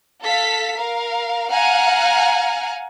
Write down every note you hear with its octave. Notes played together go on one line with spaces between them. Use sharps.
A4 F5 B6
A#4 F5
F5 F#5 G#5 A#5 F6 F#6